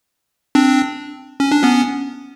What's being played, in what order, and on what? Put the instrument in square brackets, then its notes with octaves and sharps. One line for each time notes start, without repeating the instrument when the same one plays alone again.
[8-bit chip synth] C4 D4
C#4
D4
B3 C#4